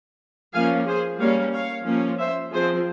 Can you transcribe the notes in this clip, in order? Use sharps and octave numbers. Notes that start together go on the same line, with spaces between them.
F3 A#3 C#4 F5 G#5
G#4 C5
G3 A#3 C#4 C#5 F5
C#5 F5
F3 A#3 C#4
C5 E5
F3 C4 G#4 C5